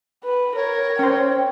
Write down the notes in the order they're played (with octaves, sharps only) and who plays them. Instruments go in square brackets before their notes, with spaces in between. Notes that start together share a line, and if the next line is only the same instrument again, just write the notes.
[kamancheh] B4
[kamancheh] A#4 [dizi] C#5
[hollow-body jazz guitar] C#4 C5 [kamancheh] G5